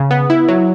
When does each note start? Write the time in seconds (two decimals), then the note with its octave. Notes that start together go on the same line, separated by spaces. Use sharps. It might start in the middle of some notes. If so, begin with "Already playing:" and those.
Already playing: C#3
0.11 B3
0.30 E4
0.48 F#3